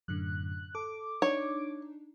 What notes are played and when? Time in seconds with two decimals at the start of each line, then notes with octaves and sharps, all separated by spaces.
0.08 F#2 A2 D3 F#6
0.75 A4 D6
1.22 D4 D#4 C#5